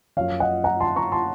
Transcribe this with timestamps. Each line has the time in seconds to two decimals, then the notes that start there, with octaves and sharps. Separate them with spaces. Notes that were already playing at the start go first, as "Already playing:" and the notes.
0.17 F#2 F3 C#5 F5
0.40 D#5 F#5
0.64 F#5 A#5
0.80 A5 C6
0.96 A#5 C#6
1.12 A5 C6